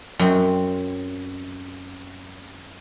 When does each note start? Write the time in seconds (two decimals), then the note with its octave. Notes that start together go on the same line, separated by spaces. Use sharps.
0.19 F#2 C4